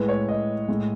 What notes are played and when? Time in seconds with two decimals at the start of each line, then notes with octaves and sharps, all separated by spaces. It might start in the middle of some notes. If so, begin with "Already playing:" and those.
Already playing: A2 G#3 B4
0.09 C#5
0.29 D#5
0.68 A2 G#3